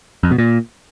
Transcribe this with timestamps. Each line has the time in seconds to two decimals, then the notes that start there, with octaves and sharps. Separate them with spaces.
0.23 F2
0.31 B2
0.38 A#2